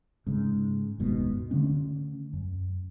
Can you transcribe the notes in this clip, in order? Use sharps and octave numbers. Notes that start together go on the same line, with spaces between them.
G#2 C#3
F#1 D#2 G#2 B2
D3 A3 C#4
F#2